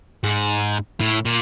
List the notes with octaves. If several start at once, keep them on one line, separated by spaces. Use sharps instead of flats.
G#2
A2
A#2